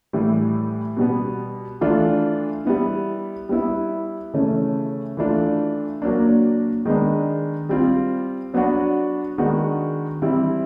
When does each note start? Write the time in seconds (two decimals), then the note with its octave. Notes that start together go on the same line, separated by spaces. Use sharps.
0.13 A2 E3 G3
0.97 B2 G3 B3
1.81 E3 A3 D4 F4
2.65 G3 B3 E4
3.49 G3 B3 E4
4.33 C#3 E3 A3 C#4
5.17 E3 A3 D4 F4
6.02 A#2 F#3 A#3 D4
6.85 D#3 G#3 B3 D4
7.69 G3 C4 F4
8.54 F#3 B3 D4 F#4
9.38 D#3 G#3 B3 D4 F#4
10.22 E3 G3 C4 E4